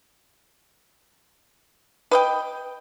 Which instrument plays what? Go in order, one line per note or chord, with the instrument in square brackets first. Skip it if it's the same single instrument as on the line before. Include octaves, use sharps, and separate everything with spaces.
[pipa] B4 D#5 G5